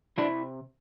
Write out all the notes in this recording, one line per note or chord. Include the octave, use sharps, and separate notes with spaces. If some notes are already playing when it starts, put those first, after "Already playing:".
C3 D4 E4